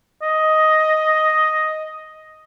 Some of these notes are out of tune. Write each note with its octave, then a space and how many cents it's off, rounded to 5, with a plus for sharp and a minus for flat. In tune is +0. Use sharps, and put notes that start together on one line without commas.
D#5 +5